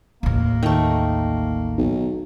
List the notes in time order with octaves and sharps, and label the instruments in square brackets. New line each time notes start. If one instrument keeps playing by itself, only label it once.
[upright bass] A1 D#2 [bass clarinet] A#3
[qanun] D#3 A3
[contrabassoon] B1